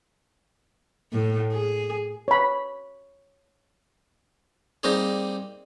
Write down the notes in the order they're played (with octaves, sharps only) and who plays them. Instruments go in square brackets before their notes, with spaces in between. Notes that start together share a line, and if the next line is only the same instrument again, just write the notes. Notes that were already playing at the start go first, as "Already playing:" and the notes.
[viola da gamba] A2
G#4
[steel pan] C#5 B5
[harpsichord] G3 A#3 C4 D#4 G4 G#4